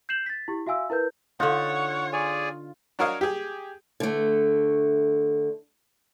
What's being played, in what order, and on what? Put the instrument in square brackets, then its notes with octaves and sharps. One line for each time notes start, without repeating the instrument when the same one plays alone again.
[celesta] G6 C7 E7 F#7
A6 B6
E4 G4
F#4 E5 F5 G#5 E6
E4 A#4 B4 G6
[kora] D3 D#4 [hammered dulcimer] F4 [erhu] C#5 [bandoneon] F#5
[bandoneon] G#4 D5 G#5
[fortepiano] D4 F#4 A#4 C#5 D#5 F5
G4 G#4
[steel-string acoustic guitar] D3 A3